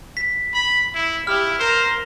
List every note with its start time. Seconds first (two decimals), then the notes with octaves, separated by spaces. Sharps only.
0.17 B6
0.54 B5
0.95 E4
1.27 E4 G4 F6
1.59 A#4 C5